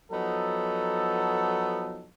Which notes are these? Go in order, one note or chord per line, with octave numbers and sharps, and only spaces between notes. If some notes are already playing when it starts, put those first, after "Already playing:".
F3 F#3 B3 D#4 A4